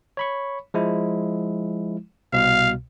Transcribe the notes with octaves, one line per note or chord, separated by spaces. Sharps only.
C#5 B5 C#6
F3 G#3 E4
C2 B2 F5